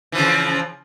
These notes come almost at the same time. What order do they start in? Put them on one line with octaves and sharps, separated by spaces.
E3 F3 C#3